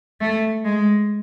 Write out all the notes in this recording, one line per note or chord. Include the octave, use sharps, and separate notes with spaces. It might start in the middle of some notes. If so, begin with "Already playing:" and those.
A3
G#3